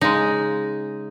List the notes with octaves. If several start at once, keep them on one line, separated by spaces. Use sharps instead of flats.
C#3 G#3 D#4